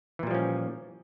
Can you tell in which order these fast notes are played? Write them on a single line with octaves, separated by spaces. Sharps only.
E3 A#2 G3 F3 C#4